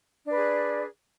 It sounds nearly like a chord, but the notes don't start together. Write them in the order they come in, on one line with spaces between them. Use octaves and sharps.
D4 B4 D5 G#4